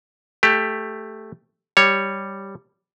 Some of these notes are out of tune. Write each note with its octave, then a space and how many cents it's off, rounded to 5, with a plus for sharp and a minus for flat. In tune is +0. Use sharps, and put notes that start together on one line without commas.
A3 +0 G4 +15
G3 +0 C#5 +0